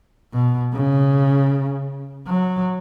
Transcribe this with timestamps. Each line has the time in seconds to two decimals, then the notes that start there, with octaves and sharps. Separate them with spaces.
0.33 B2
0.73 C#3
2.28 F#3